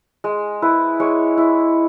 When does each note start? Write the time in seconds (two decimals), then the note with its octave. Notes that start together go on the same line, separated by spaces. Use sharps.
0.24 G#3
0.62 E4 B4
1.00 G#3 C#5
1.38 E4